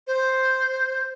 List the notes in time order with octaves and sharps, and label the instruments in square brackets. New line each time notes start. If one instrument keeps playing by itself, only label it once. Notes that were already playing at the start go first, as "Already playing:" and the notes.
[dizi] C5